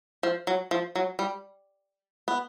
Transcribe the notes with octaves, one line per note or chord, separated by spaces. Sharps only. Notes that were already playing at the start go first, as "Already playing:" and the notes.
F3
F#3
F3
F#3
G3
B3